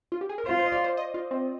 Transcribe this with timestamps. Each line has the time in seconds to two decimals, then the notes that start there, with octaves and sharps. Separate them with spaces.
0.12 F4
0.21 G4
0.29 G#4
0.38 A#4
0.46 F4 C5
0.59 C5
0.66 D#5
0.72 D5
0.84 C5
0.97 D#5
1.14 F4
1.31 C4